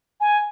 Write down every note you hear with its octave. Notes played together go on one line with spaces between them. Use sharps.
G#5